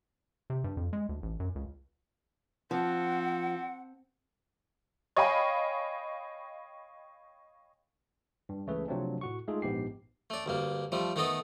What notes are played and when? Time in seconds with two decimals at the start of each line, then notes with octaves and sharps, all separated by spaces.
0.50 C3
0.64 G2
0.77 F2
0.93 G#3
1.09 D2
1.22 A1
1.40 F#2
1.55 C#2
2.71 F3 C4 F#5
5.16 C#5 D#5 F5 G5 G#5 B5
8.49 G2
8.67 C#2 E3 A3 C#4 G#4 B4
8.88 C3 F3 F#3 A3 C4 D4
9.21 A2 F#4 C#6
9.48 G#3 A3 D#4 F4 G#4 A4
9.62 A#1 G#2 B3 G4 C7
10.30 A3 D5
10.46 D2 G2 A#3
10.92 F3 G3 A3
11.16 D#3 A3 B3 A4 D#5